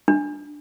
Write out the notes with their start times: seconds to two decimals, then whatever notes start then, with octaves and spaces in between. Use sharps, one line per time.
0.08 D4